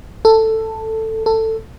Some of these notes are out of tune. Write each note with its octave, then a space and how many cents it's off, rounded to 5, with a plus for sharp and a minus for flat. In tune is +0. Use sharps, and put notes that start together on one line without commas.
A4 +10
A4 +15